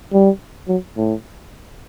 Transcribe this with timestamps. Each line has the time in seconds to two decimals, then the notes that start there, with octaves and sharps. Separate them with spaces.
0.13 G3
0.68 F#3
0.97 A2